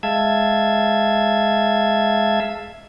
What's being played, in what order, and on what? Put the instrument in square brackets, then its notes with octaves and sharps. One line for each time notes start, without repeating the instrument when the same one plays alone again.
[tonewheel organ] G#3 E5 F5 A5 E6 G#6